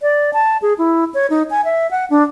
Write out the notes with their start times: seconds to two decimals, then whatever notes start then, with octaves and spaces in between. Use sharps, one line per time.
0.02 D5
0.33 A5
0.62 G#4
0.78 E4
1.14 C#5
1.30 D#4
1.51 G#5
1.65 E5
1.91 F#5
2.10 D4